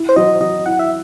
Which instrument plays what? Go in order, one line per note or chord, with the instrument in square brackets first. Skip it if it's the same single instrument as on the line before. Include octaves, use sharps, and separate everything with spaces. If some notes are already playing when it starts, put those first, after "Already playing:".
Already playing: [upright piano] E4
[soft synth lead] C5
[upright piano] F#3 [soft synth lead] D#5
[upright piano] F#3 [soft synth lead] D#5
[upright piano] E4 [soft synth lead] F#5
[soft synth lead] E5